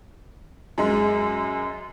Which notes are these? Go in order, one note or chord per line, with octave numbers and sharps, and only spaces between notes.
F#2 G#3